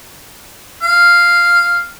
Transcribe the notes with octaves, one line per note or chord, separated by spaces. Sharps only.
F5